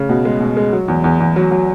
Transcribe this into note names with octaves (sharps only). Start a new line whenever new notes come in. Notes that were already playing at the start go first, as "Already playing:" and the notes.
Already playing: C#3
B2
G#3
B2
G#3
F#3
E2
E2
E2
F#3
F#3